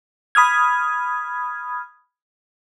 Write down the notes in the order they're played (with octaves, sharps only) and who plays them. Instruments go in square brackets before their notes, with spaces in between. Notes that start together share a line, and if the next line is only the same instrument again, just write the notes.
[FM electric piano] B5 D#6 F6 G#6